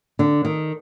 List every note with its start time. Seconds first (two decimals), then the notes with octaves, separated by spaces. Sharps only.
0.19 D3
0.45 D#3